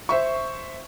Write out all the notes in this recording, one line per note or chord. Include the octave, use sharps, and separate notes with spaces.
C5 E5 C#6